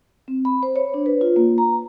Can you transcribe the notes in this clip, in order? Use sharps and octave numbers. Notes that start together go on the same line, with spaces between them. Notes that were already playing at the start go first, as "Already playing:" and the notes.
C4
B5
C5
C#5
D4
B4
F4
A#3
A#5